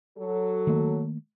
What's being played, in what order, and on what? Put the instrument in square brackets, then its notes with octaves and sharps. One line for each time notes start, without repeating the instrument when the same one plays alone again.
[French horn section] F#3 A4
[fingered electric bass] D#3 A3 A#3